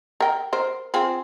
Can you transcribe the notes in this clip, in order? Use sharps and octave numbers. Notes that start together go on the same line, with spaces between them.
A#4 G5
A#4 C5
C4 F4 G#4